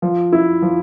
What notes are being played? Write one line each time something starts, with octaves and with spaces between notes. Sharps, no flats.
F3
E4
F3